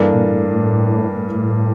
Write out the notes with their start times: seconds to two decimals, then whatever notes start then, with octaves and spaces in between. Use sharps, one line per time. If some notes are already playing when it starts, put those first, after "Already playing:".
Already playing: G2 E3 A#3 D4 A4
0.14 A#2
0.29 A2
1.16 A2